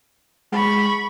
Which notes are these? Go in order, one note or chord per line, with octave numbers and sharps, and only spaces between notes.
G#3 B5 C#6